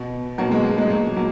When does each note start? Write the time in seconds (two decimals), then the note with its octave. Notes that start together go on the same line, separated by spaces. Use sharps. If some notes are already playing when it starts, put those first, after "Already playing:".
Already playing: B2
0.38 B2 F#3 A#3
0.51 G#3
0.65 F#3
0.78 G#3
0.90 A#2 F#3 A#3
1.17 F#3 A#3